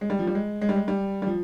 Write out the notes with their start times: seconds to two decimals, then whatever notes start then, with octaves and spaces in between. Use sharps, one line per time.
0.01 G#3
0.10 G3
0.19 F3
0.27 G3
0.35 G#3
0.61 G#3
0.69 G3
0.76 G#3
0.88 G3
1.22 G3
1.27 F3